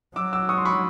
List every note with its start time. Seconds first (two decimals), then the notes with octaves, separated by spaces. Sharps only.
0.16 F#3 D6 E6
0.33 D6 E6
0.49 C#6 D#6
0.58 C6
0.65 B5 C#6